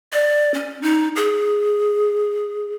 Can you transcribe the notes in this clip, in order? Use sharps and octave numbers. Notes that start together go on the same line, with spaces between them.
D5
C#4
D#4
G#4